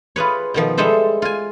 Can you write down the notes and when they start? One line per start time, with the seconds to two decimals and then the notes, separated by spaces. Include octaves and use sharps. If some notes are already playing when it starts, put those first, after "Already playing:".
0.16 F4 G#4 B4 C#5
0.54 B2 D#3 F3
0.77 G3 G#3 A4 C5 E5
1.22 F4 G#5